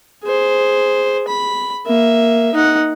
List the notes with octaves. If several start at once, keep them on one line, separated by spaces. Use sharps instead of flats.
G#4 C5
B5
A#3 E5
D#4 F#5